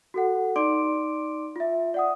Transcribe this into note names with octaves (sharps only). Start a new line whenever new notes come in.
F#4 A4 F#5
D#4 D5 C6 D6 D7
F4 E5
D5 F#5 D#6